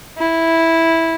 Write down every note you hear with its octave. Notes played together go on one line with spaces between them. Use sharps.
E4